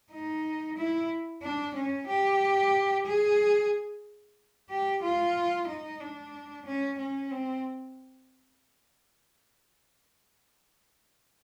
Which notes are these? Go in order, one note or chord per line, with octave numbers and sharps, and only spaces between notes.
D#4
E4
D4
C#4
G4
G#4
G4
F4
D#4
D4
C#4
C#4
C4